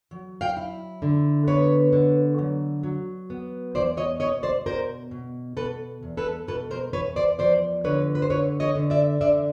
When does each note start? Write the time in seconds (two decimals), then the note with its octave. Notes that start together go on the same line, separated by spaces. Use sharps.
0.11 F#3
0.41 F5 G5
0.57 E4
1.02 D3
1.47 B3 B4 C#5
1.93 D3
2.38 F#3
2.83 F#3
3.30 B3
3.75 E2 C5 D5
3.97 C#5 D#5
4.20 B2 C#5 D#5
4.43 C5 D5
4.66 B2 A#4 C5
5.11 B2
5.57 B2 A4 B4
6.03 E2
6.17 A4 B4
6.48 B2 A4 B4
6.71 A#4 C5
6.93 E2 B4 C#5
7.16 C5 D5
7.39 F3 C5 D5
7.84 D3 B4 C#5
8.15 B4
8.22 C5
8.30 D3 B4 C#5
8.60 C#5 D#5
8.75 D3
8.90 D5 E5
9.21 D3 D5 E5